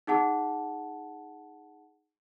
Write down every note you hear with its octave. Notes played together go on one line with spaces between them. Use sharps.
D#4 G#4 F#5 A5